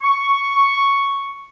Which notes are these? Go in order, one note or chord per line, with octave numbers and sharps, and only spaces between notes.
C#6